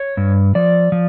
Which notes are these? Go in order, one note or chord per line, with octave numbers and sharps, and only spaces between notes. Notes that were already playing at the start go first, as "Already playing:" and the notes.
Already playing: C#5
G2
F3 D5
F3